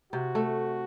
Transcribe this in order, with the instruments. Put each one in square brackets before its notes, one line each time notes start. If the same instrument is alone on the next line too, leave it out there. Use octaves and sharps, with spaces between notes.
[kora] C3 [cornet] F#4
[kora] A3